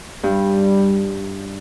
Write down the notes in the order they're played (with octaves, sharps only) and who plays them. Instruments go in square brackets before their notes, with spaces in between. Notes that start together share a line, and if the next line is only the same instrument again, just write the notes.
[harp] G2 [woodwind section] G3